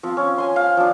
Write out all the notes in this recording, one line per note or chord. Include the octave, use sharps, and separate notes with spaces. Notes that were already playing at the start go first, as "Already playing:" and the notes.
F3 C4
C#4
G#5 C6
F5
F3 D4